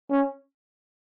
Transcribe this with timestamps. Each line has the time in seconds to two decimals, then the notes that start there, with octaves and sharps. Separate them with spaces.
0.11 C#4